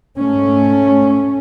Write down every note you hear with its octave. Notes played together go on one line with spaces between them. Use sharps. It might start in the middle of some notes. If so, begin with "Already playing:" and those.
G#2 A3 C#4